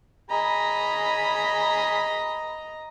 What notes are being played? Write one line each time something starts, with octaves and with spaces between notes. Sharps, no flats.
G#4 D#5 A#5 B5